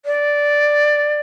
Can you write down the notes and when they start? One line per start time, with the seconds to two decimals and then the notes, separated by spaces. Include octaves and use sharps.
0.05 D5